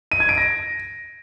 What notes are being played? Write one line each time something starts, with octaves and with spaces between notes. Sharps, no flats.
D#7
G#6
D7
A#6